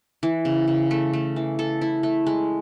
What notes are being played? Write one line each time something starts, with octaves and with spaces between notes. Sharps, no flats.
E3
C#3
C#3
A3
A3
E3
A4
E4
A3
G#3